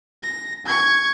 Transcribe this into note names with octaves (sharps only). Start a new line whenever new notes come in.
A#6
C#6 G#6